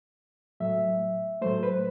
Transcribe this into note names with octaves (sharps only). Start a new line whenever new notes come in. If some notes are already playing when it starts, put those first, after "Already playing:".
A2 F#3 A3 E5
A2 F#3 A3 C5
B4